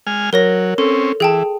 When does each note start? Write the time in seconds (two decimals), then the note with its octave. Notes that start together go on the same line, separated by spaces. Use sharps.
0.07 G#3 G#5 F6
0.33 F#3 A#4 C#5 A#6
0.78 C4 C#4 A4
1.20 E3 G#4 G5 A5